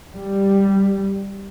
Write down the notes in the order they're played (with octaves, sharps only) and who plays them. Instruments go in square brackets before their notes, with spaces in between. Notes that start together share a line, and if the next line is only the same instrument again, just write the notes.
[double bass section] G3